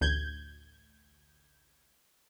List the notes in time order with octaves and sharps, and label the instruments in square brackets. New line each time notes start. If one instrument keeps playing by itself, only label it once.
[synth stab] A1 D2 G6 G#6